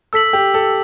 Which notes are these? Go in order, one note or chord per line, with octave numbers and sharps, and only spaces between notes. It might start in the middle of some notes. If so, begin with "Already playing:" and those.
A4 E6 B6 F#7
G4
A4